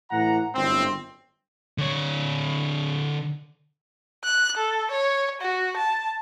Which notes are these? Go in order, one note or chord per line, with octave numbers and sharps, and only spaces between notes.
A2 E3 F#5 A#5
G1 F#2 A2 C4
D3 C#5
F#6
A4
C#5
F#4
A5